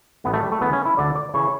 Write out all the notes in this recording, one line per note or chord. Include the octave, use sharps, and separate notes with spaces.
A1 A2 E3 B3
A3
G3
A3
D2 C#3 E3 B3
C#4
E4
D2 D3 D5
D5
C#3 E3 C#5